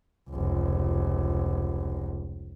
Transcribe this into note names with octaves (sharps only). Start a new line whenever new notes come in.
F1 C#2